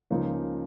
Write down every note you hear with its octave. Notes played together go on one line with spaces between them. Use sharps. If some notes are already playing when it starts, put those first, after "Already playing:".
C#2 C#3 F3 A#3 D#4